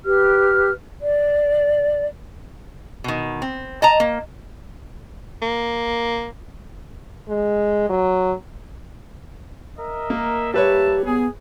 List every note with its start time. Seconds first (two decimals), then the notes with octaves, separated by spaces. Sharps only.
0.05 G4 B4 F6
1.00 D5
3.04 B2 D#3
3.42 C4
3.82 D#5 A5 A#5
4.00 A#3
5.42 A#3
7.29 G#3
7.89 F#3
9.78 A#4 D#5 E5
10.10 A#3
10.54 G3 A#3 G4 B4 C#5 E5 A5
11.06 B3 G#4